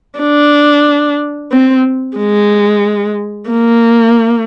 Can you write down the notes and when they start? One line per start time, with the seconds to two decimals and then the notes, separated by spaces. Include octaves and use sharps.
0.19 D4
1.52 C4
2.17 G#3
3.50 A#3